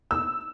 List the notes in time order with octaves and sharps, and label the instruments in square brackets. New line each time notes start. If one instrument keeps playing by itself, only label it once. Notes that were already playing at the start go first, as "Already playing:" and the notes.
[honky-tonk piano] E6